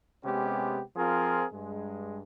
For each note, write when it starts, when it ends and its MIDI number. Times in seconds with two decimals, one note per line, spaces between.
0.23 0.80 48
0.23 0.80 56
0.23 0.80 59
0.23 0.80 61
0.23 0.80 67
0.95 1.44 53
0.95 1.44 60
0.95 1.44 65
0.95 1.44 68
0.95 1.44 70
1.52 2.18 43
1.52 2.18 56